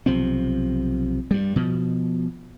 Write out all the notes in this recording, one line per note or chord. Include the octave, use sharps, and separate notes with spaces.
B1 C3 F3 C4
G2 G3
B2 F3